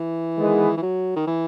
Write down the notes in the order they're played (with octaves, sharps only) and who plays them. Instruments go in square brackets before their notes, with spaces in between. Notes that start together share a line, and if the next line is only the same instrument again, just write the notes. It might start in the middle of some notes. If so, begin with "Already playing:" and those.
Already playing: [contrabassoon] E3
[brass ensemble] D#3 G#3 B3
[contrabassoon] E3
F#3
D#3
E3